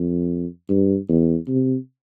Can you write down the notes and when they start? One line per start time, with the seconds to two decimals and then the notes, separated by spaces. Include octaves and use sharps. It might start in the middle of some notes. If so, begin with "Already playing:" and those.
Already playing: F2
0.69 G2
1.09 E2
1.48 C3